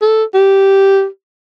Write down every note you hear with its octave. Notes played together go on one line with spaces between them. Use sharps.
A4
G4